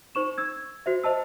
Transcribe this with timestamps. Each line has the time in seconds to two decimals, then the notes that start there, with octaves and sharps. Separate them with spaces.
0.15 D#4 C5 C#6 E7
0.38 E6 G#6
0.86 F#4 C5 E5
1.04 C5 D#5 A5 E6